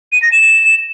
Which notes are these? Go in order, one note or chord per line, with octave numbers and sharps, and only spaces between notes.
D#7
A#6
E7